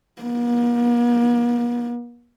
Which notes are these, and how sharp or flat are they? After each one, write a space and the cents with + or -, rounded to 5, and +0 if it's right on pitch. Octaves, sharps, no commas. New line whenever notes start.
A#3 +45